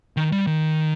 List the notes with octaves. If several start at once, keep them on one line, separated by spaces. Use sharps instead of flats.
D#3
G3
D#3